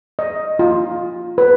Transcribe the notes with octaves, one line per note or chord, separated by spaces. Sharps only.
D#5
F4
B4